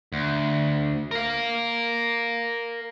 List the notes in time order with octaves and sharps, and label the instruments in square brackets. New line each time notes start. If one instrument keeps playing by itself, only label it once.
[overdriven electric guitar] D2
A#4 F5